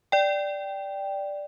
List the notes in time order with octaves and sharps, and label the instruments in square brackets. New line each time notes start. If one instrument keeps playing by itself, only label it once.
[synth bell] D5 G5